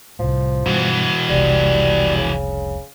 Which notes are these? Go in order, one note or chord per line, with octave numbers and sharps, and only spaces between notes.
C2 A2 F3
G2 B2 D3 E3 F#4
F1 C2 G3
C#3